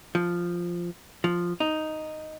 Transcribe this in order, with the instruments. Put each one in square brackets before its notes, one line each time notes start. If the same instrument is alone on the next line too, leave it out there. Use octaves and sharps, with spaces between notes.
[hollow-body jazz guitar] F3
F3
D#4